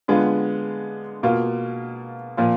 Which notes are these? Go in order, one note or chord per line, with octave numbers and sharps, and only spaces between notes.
D3 G#3 B3 F4
B2 A#3 F4
A#2 F3 A#3 F4